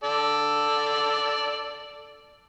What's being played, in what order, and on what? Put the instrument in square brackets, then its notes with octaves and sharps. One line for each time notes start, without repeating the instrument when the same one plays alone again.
[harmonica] A4 D5